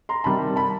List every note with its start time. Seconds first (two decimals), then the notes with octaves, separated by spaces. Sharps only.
0.09 A#5 C6
0.24 C3 D#3 G3 A5 B5
0.56 A5 B5